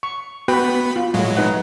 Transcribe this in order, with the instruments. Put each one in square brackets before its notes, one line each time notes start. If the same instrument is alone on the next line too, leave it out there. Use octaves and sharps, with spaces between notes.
[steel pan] C#6
[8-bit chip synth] B3 B5 [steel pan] F#4 B4 G5
[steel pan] F4
[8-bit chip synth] A2 F#3 G#3
[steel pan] D#4 B4 F#5